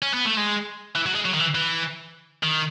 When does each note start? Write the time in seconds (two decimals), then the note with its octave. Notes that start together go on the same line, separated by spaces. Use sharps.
0.02 C#4
0.14 B3
0.26 A3
0.37 G#3
0.95 E3
1.06 F#3
1.15 G#3
1.25 F#3
1.34 D#3
1.39 E3
1.55 E3
2.43 D#3